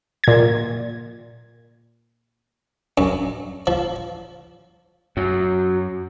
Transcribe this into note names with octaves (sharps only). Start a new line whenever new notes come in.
A#2 G#6
F#2
F3
F#2 F#3